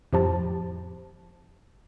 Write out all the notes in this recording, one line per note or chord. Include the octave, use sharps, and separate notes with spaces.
F2 A2 F3 G4 C5 A5